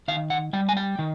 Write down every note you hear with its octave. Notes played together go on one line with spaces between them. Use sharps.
D#3 F5
F#5
G3 G5
G#5
G5
D#3